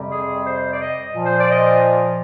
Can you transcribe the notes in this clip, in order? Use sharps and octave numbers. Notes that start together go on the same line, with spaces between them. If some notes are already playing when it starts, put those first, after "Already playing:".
Already playing: F2 C3 G3
G#4
C5
D5
D#5
A#2 F3
C5
D5
D#5